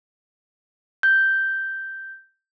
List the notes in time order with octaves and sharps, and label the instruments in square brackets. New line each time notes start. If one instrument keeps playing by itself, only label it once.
[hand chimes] G6